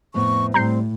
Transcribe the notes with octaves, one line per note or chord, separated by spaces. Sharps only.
F2 A2 B3 C#6
A2 G3 C4 A#5 G6 C7